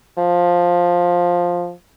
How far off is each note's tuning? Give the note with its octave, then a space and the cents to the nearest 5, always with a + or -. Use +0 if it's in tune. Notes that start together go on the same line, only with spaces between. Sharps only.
F3 +10